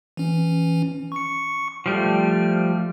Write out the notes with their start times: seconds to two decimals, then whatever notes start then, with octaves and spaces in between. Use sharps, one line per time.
0.17 E3 C#4
1.12 C#6 C#7
1.86 F3 G3 A3 F6